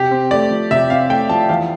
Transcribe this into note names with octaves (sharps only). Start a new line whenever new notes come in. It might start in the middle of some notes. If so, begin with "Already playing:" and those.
Already playing: C3 G4
C4
A3 D5
F3
C3 E5
C4 F5
A3 G5
F3 A5
E2 F5